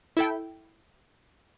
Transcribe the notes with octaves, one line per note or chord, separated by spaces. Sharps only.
E4 A4 G5